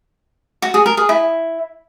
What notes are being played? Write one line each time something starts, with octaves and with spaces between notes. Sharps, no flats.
F#4
G#4
A#4
G#4
E4